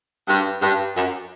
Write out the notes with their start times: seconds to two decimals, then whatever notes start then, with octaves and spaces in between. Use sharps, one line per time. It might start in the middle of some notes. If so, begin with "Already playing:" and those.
0.28 G2
0.61 G2
0.96 F#2